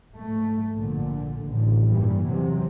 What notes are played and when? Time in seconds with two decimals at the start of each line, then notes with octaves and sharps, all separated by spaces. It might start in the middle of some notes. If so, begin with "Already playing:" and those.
0.16 G#2 A3
0.75 A#1 A#2 D3
1.46 A1 A2 D3
1.87 G2 A#2 E3 G3
2.25 E2 C3 F#3